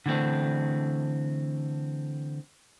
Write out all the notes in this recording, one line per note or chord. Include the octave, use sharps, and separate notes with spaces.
D3 E3 A3 C4 D4